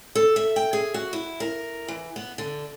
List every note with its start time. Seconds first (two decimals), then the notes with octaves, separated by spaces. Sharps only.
0.15 A4
0.36 E5
0.56 G5
0.73 G#4
0.94 F#4
1.13 E4
1.40 A#4
1.88 E3
2.16 B3
2.38 D3